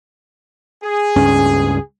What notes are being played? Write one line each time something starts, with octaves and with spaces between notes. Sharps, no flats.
G#4
C#2 G2 C#4